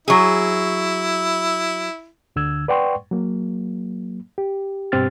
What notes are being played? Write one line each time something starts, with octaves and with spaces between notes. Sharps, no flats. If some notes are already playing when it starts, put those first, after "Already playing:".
F#3 E4 G#4
D2 D3 E6 G#6
B4 D5 F#5 G5 C6 C#6
F#3 A#3
G4
G2 B2 C4 G4 F6 A6